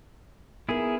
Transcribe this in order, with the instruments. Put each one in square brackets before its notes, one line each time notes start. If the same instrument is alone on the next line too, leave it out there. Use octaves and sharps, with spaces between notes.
[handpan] B3 D#4 A#4 [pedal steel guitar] E4 G#4